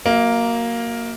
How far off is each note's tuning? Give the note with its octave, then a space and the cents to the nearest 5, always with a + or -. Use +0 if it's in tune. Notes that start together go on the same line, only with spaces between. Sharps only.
F#3 +0 A#3 +0 E5 -45